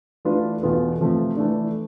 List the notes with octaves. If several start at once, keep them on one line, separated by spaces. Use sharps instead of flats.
E3 A3 D4 F4 B4
E2 B2 B3 F4 A4
C3 F3 A3
E3 A3 D4